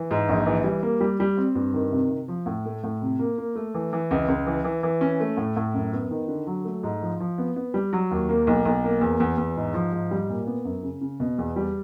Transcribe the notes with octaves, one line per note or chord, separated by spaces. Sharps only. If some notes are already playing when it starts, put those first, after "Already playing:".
Already playing: E3
G#2
A#1
E3
G3
A#3
G3
G3
C4
G2
D#3
C3
C3
F3
A2
A3
A2
C3
A#3
A#3
A3
E3
E3
C#2
C#2
E3
E3
E3
C#4
A3
A2
A2
F#2
B3
D#3
D3
F#3
A3
G#2
F3
F3
B3
B3
G3
F#3
D#2
A#3
B1
B1
A#3
E2
E2
E2
G#2
F3
G#2
G3
A#2
B3
F#2
C#3
C#3
B2
E2
G3